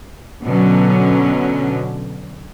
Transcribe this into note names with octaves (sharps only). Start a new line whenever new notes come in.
B2 D3 F#3 C#4